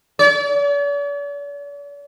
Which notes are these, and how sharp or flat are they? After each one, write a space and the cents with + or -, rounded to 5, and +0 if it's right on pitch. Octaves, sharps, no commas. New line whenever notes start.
D5 -45